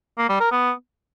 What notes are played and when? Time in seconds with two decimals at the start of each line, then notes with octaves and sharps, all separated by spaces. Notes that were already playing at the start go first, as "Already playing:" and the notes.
0.18 A#3
0.29 G3
0.40 A#4
0.52 B3